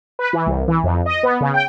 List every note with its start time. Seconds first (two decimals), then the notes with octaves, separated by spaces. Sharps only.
0.19 B4
0.33 E3
0.46 C2
0.68 E3
0.84 F2
1.06 D#5
1.23 B3
1.41 C#3
1.54 G5